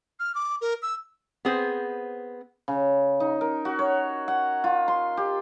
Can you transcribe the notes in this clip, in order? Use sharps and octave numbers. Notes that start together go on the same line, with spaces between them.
F6
D6
A#4
E6
B3 C4 G#4 C5
C#3
D#4
A#4
F#4
C#5
F#5
F4
C6
G4